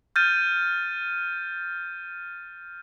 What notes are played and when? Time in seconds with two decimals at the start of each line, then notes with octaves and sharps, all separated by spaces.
0.16 F6 G6 A6 D#7